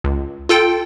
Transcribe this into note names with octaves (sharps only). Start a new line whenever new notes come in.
C#2
F4 A4 G5